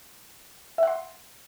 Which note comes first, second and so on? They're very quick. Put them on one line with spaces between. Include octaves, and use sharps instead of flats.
E5 F#5 C6